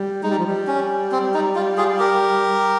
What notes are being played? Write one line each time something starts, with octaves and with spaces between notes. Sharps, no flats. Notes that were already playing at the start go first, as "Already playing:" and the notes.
Already playing: G3
G#3 D#4
G3
F3
G3
C#4
C4
D#4
F4
F4 G#4
G4 A#4